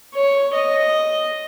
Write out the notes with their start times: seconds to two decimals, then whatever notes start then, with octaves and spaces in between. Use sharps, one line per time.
0.14 C#5
0.54 D#5